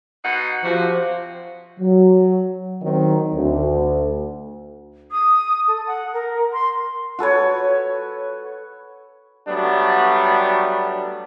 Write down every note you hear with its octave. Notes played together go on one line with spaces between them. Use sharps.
B2 D#4 F#5
C3 F3 F#4
F#3
D#3 F#3 C4 D#4
D2
D#6
A4
F#5
A#4
C6
F#4 A4 B4 C#5
F#3 G3 A3 B3 D4